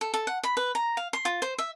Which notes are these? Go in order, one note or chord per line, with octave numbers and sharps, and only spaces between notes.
A4
A4
F#5
B5
B4
A#5
F5
C6
F4
C5
E5